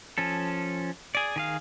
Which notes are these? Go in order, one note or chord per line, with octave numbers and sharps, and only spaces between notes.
F3 C#4 A4
G#4 D5
D#3 G#4 F5